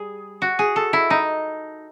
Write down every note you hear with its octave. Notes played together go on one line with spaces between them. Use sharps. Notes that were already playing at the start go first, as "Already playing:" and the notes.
Already playing: G3 G#4
F#4
G#4
A4
E4
D#4